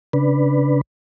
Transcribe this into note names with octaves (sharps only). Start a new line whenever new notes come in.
C#3 D4 B4